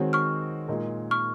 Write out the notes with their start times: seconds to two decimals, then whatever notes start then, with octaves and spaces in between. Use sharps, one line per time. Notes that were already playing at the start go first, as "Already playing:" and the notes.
Already playing: D#3 G#3 C4 F#4 C#5
0.13 C#6 F6
0.68 A#2 G#3 D#4 A#4
1.11 C#6 F6